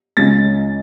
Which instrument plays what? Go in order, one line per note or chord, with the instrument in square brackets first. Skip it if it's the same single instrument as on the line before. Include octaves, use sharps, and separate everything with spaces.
[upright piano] C#2 C#3 G#3 A6